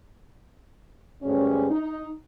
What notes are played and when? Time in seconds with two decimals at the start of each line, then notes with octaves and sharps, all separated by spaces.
1.22 D2 G2 G#3 C#4
1.70 D#4